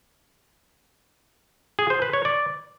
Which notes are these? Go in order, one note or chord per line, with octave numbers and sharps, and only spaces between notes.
G#4
C5
B4
C#5
D5